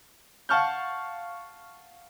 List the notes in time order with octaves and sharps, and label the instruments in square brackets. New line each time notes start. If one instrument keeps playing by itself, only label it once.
[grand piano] F5 F#5 A5 C#6 F6 G6